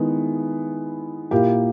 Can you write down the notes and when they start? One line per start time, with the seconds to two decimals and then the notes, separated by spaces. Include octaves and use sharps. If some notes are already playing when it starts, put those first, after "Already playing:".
Already playing: D#3 G#3 B3 E4
1.31 A#2 A#3 E4 G4